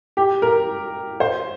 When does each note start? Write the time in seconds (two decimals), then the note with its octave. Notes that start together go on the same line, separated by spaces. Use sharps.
0.17 G4
0.42 A#4
1.20 C5